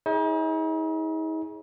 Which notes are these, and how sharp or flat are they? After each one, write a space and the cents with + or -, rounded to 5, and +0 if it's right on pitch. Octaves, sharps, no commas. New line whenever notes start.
D#4 +45 G#4 +0 C#5 -5